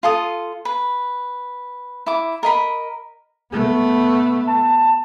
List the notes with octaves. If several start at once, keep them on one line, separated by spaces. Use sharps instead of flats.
F4 A4 D#6
B4
E4 D6
A#4 D#5 B5
A3 B3
A5